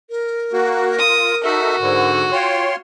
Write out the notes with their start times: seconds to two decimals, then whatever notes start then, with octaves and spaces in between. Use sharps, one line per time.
0.10 A#4
0.53 A#3 F#4
0.99 F4 D#6
1.44 D#4 F#4 A4 E5
1.80 G#2 D3
2.32 F4 C#5 G5 C6